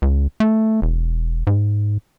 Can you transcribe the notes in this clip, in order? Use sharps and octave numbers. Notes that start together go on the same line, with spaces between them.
C#2
A3
E1
G#2